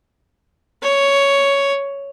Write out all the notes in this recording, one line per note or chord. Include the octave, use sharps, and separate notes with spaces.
C#5